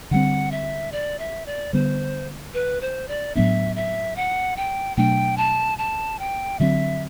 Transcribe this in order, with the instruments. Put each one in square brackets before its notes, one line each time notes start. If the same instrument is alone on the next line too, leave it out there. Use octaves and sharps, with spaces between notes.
[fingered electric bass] D3 G3 C4 [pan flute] F#5
[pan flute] E5
D5
E5
D5
[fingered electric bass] D3 G3 B3 [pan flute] C5
[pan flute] B4
C5
D5
[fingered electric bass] A2 F#3 B3 D4 [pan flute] E5
[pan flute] E5
F#5
G5
[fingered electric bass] B2 F#3 A3 D4 [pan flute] G5
[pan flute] A5
A5
G5
[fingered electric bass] D3 F#3 C4 [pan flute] E5